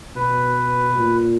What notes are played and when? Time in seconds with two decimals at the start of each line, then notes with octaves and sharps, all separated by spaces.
0.16 B2 B4
0.98 A#2